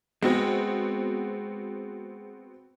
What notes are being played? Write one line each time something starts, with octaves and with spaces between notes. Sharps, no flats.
G#3 B3 C4 F#4